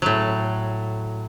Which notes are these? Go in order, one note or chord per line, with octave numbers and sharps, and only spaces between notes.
A2 F#3